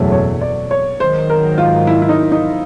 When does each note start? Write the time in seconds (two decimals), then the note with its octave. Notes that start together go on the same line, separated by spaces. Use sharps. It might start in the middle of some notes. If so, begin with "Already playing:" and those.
Already playing: F#1 E2 B2 F#3 A3
0.12 C#5
0.41 D5
0.71 C#5
1.00 G#2 D#3 F#3 C5
1.30 A#4
1.58 F4
1.87 E4
2.02 E4
2.09 D#4
2.32 D#4